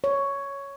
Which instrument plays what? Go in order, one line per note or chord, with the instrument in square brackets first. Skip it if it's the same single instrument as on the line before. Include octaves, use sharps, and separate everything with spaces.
[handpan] C#5